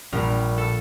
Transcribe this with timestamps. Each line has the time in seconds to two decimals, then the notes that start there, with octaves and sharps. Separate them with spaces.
0.12 A#1 A#2 G3 A#4
0.58 A4